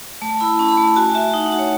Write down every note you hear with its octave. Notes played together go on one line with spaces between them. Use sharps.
A3 A5
E4 B5
C#4 A5
B5
A3 A5
A5
F#4 G#5
F#4 E5
D#4 F#5
F#5
F#4
C#5